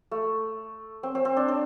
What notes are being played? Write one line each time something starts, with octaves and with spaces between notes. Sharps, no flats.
A3
C4
C4
C4
D4
D4